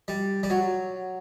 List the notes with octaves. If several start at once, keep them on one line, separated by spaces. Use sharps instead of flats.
G3
G3
F#3